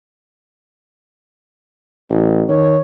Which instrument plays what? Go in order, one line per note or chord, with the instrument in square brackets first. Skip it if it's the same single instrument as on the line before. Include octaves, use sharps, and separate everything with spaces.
[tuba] A1
[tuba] D#3 [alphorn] C#5